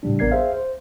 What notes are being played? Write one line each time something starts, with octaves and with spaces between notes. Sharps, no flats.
A2 C#3 G3 D4
A1 B3 A#4 D5 G#6 C7
G#4 C5 E5 F5
C5